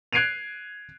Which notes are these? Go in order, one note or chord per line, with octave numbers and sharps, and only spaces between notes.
F#6 G#6 C7 D7 D#7 F7